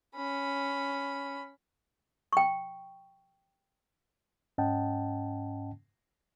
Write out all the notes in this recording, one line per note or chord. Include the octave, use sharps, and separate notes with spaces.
C#4 B5
G5 C#6
G#2 C#4 D#5 F#5 G5 A5